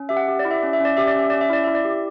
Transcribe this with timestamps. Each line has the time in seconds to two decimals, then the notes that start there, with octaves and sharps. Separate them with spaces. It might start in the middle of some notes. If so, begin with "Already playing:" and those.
Already playing: C#4
0.09 G4 E5
0.17 F#5
0.28 G4
0.39 D5
0.45 E4
0.51 E5
0.62 C#4 D5
0.73 E5
0.80 C#4 D5
0.97 G4 E5
1.08 D5
1.15 C#4 E5
1.30 C#4 D5
1.41 E5
1.50 E4 D5
1.64 E4 E5
1.75 D5
1.85 G4